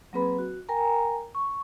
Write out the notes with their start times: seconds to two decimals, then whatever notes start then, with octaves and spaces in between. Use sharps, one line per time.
0.13 F#3 A#3 C4 G#4 B4 B5
0.39 F#4
0.69 A#4 G5 G#5 A#5
1.35 C#6